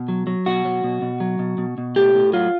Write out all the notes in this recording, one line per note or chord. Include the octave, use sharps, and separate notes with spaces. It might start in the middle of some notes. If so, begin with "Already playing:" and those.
Already playing: B2
F#3
F#3
B2 F#4
F#3
B2
B2
F#3
B2
B2
B2
A2 G4
A2
F#3 F4